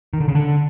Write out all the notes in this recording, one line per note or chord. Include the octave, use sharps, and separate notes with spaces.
D#3
D3
C#3
D3